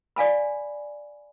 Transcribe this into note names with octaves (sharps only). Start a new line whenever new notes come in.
D5 F5 G#5 B5